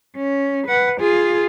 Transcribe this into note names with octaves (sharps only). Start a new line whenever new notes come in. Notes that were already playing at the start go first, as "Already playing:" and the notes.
C#4
B4 F#5
F4 G#4